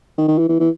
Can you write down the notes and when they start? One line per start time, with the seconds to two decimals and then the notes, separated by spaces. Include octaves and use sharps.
0.18 D#3
0.28 D#3
0.39 E3
0.49 E3
0.60 E3